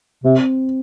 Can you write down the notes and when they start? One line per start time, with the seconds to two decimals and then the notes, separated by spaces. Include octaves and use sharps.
0.24 C3 C4